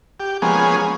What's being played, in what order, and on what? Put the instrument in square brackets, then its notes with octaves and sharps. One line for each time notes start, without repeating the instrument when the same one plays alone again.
[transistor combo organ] G4
F3 G#3 A#3 B3 C#4 G#4